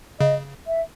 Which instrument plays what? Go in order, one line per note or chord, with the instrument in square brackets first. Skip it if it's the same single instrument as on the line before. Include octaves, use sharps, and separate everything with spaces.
[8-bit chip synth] C#3 [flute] D#5
[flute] E5